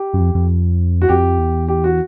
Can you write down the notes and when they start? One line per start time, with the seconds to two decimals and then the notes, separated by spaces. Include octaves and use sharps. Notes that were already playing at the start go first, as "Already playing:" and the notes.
Already playing: G4
0.13 F#2
0.20 F2
0.35 F2
1.02 F#4
1.09 F2 G4
1.38 E2
1.68 G4
1.84 F#4